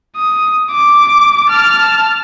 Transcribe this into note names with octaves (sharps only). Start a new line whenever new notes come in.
D#6
D6
A5 F6